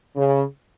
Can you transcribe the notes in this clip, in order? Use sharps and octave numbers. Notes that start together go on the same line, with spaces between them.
C#3